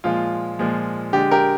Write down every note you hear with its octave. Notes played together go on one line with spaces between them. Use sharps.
A#2 F3 G#3 F4
A#2 F3 G#3
D3 G#3 G4
G4 A#4